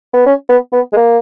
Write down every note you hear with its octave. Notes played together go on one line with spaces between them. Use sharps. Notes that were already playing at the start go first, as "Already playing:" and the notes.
B3
C#4
B3
B3
G#3
A#3